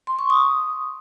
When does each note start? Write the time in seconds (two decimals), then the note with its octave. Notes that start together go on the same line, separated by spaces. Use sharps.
0.07 C6
0.19 C#6
0.30 D#6